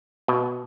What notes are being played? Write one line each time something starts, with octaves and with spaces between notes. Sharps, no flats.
B2